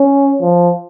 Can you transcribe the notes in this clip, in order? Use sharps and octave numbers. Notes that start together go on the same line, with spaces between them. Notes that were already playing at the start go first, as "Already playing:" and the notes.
Already playing: C#4
F3